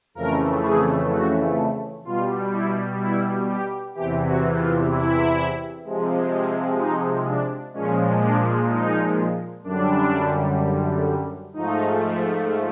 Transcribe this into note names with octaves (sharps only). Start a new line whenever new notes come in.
F2 C#3 E3 A3 A#4
G#4
F#4
B2 G3 F4
E4
E4
G4
E2 C3 E3 G4
F#4
F4
E4
C3 F3 G#3
D#4
D4
A#2 F3 G#3 C#4
D4
D#4
F#2 D3 G3 D4
G#2 F3 A3 D#4